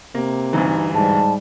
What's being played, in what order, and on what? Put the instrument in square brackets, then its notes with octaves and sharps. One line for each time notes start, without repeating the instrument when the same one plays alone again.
[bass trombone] C3 [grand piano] A#3
[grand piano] D2 G2 E3 [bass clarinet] D#4
[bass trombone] G#2 [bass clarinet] G3 [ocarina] A5